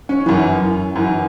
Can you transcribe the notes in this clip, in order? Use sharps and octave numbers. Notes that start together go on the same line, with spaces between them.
C#4
F#2 E3
F#2 E3